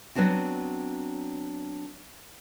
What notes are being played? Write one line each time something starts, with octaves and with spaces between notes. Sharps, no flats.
F#3 B3 C4 D4 F#4